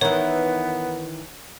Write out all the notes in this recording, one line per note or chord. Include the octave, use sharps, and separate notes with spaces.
D#3 E3 B3 C#5